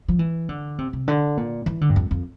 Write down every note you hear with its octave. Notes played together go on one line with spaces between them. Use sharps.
F3
E3
D3
C3
C3
D3
A#2
E3
D3
G2
F2
F2